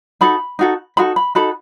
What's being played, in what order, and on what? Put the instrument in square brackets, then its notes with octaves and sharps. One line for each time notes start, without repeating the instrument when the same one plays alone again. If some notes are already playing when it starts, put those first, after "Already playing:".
[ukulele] D#4 F#4 A4 B5
D#4 F#4 A4
D#4 F#4 A4 B5
B5
D#4 F#4 A4 B5